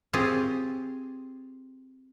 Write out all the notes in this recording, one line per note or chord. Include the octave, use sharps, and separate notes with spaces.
C4 F4 G4 G#4 C#5